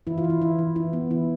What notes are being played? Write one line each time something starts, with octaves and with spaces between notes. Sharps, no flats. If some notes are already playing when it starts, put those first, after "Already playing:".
E3 E4
F4
E3
E4
E3 E4
E3
E3 E4
B3
E3 E4